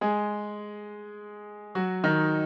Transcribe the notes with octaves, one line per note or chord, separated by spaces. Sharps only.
G#3 G#4
F#3 F#4
D#3 D#4